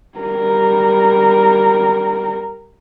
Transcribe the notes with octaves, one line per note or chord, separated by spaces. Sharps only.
G3 A#4